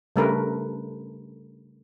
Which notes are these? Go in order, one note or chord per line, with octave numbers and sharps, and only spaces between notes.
C#3 G3 A3 D4 A#4 B4